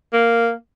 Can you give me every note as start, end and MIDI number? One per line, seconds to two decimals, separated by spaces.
0.13 0.52 58